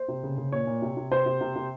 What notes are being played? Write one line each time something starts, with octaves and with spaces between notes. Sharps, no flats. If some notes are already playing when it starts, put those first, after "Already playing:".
Already playing: C5
C3
C#3
C#3
A#2 C#5
A#2
C3
C3
C3 C5
C3
C3
C3